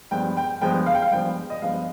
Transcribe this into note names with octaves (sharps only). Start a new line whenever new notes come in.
G2 F3 G#3 B3 G5
G5
G2 F3 G#3 B3 G5
F5
G5
F5
G2 F3 G#3 B3 G5
D#5
G2 F3 G#3 B3 F5